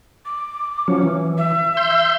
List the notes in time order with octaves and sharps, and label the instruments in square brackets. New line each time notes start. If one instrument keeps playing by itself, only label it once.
[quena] D6
[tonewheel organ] F3 F#3 C#4
E3
[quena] E5
[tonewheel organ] C6 G6